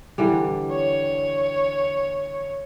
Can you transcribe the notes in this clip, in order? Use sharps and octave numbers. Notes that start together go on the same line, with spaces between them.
D3 E3 G3
C#5